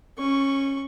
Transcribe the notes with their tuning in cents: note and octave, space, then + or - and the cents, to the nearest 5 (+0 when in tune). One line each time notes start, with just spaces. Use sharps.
C#4 -20 C#6 +0